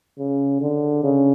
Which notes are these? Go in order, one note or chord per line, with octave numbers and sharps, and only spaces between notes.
C#3
D3
C#3